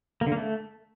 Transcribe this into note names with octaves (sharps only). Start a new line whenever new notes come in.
A#3
D3
A#3
A3